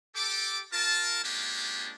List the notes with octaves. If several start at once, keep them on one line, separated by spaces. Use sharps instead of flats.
G4 A4 D6
F4 A#4 A5
G#3 A#3 C#4 D4 F4 G4